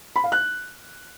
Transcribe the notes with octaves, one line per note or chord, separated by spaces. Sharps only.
B5
F5
F#6